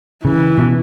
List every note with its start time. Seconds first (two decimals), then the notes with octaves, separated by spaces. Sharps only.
0.24 C#3 E3
0.58 B2